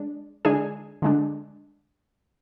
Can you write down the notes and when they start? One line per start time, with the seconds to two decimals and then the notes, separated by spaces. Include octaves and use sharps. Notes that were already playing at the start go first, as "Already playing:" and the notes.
Already playing: G#3 D4
0.45 D3 G#3 D4 G#4 G#5
1.02 D3 G#3 D4